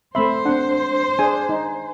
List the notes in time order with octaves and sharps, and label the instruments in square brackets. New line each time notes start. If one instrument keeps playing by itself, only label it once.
[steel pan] A3 C4 E5 [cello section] C5 [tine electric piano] B5 C6
[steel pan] C4 F#5 [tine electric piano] D4
[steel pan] D4 G#4 [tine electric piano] G#5
[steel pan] D#4